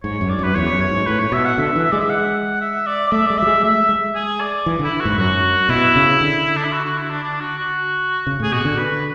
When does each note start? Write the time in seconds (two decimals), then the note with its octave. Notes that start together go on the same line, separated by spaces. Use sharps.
0.03 G#2 C#5
0.21 F#2
0.30 D5
0.39 F#2 B4
0.55 E2 C#5
0.73 F#2
0.81 C#5
0.89 G#2
1.07 A2 B4
1.19 C#5
1.32 B2 E5
1.45 F#5
1.58 D3 E5
1.76 E3
1.84 E5
1.92 G#3 D5
2.00 E5
2.10 F#5
2.61 E5
2.87 D5
3.07 D5
3.12 A3 E5
3.26 G#3 D5
3.38 F#3 E5
3.46 G#3
3.63 A3 E5
3.89 G#3
4.15 G#4
4.41 D5
4.66 E3
4.79 D3
4.84 E4
5.00 F#4
5.05 G#2
5.18 F#2 F#4
5.69 B2 E4
5.96 C#3
6.21 D3
6.57 D4
6.65 E4
6.73 F#4
6.85 F#4
6.98 E4
7.10 D4
7.23 D4
7.41 F#4
7.58 F#4
8.27 C#3
8.40 A2 G#4
8.52 B2 F#4
8.65 D3
8.78 B4